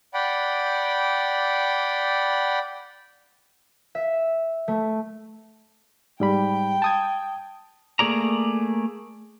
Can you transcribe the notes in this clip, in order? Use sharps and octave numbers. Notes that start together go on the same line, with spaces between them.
D5 F#5 G5 B5
E5
A3
G#2 G3 G5 B5
A5 D#6 G#6
A3 A#3 G#4 D5 A#5